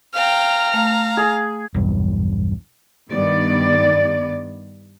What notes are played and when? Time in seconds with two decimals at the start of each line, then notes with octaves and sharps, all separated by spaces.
0.14 F5 G5 A#5 F6
0.74 A3 F5
1.17 G#4
1.75 B1 E2 G2
3.11 G2 D#3 B3 D5